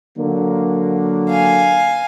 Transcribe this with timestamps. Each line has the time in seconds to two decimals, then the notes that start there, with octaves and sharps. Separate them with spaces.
0.18 D3 F#3 A#3
1.29 F5 G#5